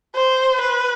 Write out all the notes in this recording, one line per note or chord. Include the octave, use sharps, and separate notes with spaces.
C5
B4